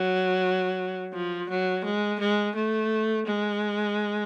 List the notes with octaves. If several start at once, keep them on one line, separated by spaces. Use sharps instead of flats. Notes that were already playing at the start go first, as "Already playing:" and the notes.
Already playing: F#3
F3
F#3
G#3
G#3
A3
G#3